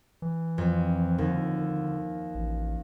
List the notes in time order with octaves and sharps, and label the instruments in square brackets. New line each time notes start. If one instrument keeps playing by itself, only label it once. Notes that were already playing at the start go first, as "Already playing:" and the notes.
[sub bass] E3
[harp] F2
[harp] D#2 [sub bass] D3
[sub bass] A1